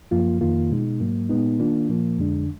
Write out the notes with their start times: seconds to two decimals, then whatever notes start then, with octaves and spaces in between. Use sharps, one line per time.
0.11 F#2 F3 A#3 F4
0.41 F2 D#3 A#3 F4
0.71 B2 G#3 D#4
1.00 G#2 F#3 A#3
1.29 A#2 G#3 B3 D#4
1.59 D#3 A#3 D4 F4
1.89 A#2 F3 A#3
2.18 F2 D3 G#3 D4